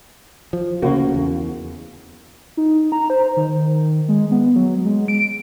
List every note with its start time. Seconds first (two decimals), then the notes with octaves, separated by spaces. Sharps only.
0.53 F3
0.82 D2 C#3 A#3 F#4
1.14 E2
2.57 D#4
2.92 A#5
3.10 C5
3.37 D#3
4.09 G#3
4.31 B3
4.55 F#3
4.85 G#3
5.08 D7